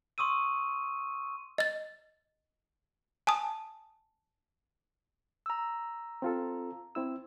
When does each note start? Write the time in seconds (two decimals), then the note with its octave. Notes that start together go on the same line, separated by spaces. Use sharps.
0.18 C6 C#6 D#6 E6 D#7
1.58 D#5 A6
3.27 G#5 A5 D#6
5.46 A#5 E6
6.22 C4 F4 A4
6.95 C4 E4 E6